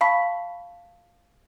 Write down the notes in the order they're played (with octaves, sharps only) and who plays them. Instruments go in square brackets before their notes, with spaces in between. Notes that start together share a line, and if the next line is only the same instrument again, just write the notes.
[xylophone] F5 A5 B5 C#6 B6